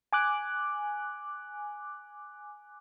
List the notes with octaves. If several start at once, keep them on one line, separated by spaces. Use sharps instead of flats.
G#5 D6 F#6